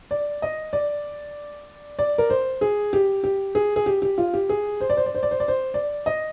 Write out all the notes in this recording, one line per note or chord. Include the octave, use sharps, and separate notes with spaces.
D5
D#5
D5
D5
A#4
C5
G#4
G4
G4
G#4
G#4
G4
G4
F4
G4
G#4
C5
D5
C5
D5
C5
D5
C5
D5
C5
D5
D#5